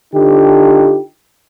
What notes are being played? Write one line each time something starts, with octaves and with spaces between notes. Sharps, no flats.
D3 D#4 F4 G4